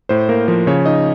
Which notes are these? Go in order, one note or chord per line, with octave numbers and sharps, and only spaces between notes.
A2 C5
A#3 A#4
F3 A#4
C#3 C#5
D#4 D#5